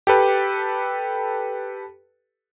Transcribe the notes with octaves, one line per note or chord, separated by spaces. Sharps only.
G4 A4 B4